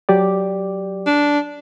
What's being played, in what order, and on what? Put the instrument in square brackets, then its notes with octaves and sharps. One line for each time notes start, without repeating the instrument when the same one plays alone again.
[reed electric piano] F#3 G4 D5
[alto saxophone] D4